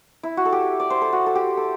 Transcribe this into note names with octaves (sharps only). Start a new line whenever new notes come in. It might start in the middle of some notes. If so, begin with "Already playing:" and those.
E4
F#4
A4
G4
D5
C5
A4
F#4
A4
G4
A4